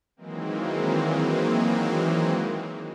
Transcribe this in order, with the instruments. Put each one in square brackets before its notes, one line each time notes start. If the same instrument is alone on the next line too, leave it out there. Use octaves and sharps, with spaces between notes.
[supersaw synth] D#3 E3 F#3 G#3 A#3 C4